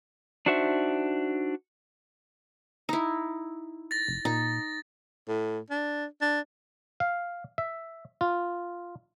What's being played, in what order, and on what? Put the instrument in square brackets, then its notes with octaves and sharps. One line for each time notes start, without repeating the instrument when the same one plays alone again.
[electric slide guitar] D4 D#4 F#4 C5 E5
[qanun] D#4 E4
[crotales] A6 A#6
[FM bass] F1
[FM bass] A#2 [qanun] D#4
[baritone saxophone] A2
D4
D4
[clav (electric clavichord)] F5
E5
F4